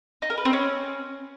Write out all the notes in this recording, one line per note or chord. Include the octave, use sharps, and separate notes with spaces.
D#4
A#4
B4
C4
C#4